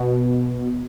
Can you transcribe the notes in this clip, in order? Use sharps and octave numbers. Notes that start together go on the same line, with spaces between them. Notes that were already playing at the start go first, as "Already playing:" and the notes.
Already playing: B2